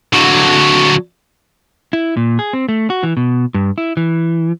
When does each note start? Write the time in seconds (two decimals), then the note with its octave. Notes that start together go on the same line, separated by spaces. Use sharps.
0.13 D3 F#3
1.93 E4
2.17 A#2
2.39 G#4
2.53 C4
2.69 A3
2.90 F#4
3.03 E3
3.17 B2
3.54 G2
3.78 E4
3.97 E3